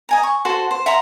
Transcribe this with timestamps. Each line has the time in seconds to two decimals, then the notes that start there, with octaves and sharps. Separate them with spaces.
0.09 D#5 G#5 A#5
0.23 C#6
0.45 F#4 A4 C5 C6
0.71 C5
0.86 E5 F#5 A#5 C6